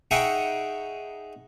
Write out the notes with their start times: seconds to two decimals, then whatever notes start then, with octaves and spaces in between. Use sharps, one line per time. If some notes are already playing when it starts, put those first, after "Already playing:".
0.11 D#4 G#4 E5 F#5 G5 C#6